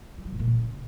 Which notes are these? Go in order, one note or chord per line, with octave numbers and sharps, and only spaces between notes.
F3
F#3
A2
A#2
C#3